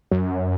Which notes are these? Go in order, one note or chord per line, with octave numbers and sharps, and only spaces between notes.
F#2